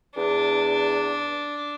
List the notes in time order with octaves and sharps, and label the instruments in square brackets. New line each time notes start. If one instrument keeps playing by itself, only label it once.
[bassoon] E2 [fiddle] D4